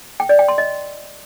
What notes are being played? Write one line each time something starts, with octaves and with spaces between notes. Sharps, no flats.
G5
D5
G5
C6
D#5